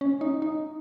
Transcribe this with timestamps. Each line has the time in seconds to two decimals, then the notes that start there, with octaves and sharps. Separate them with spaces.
0.01 C#4
0.21 D#4
0.42 D#4